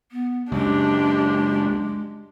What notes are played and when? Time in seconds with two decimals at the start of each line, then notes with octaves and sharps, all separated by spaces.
0.11 B3
0.52 C#2 F#2 G#3 D4 G4